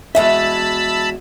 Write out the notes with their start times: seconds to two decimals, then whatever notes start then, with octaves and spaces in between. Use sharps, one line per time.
0.15 E2 G#3 F#4 E5 A5 B5 E6